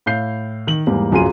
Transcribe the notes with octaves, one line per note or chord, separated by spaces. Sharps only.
A2 F5 G6 C7
D#3 F#7
E2 G#2 G3 A#3
D1 F#2 F4 G#4 C6 D#7